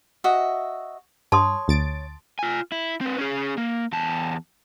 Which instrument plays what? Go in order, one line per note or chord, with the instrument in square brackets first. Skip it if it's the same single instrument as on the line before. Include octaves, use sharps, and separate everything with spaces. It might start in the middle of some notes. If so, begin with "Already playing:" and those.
[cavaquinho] F#4 D#5 E5
[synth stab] G2 [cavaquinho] C#5 [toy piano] A5 C6 D#6
[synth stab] D2 A6 D7
[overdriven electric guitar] F4 G#5
E4
C4 B4
C#4 G#4
A#3
E2 A5